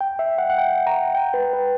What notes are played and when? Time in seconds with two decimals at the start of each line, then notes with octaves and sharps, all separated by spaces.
0.01 G5
0.19 E5
0.38 F#5
0.50 F#5
0.58 G5
0.87 A#5
1.15 G5
1.34 B4
1.53 B4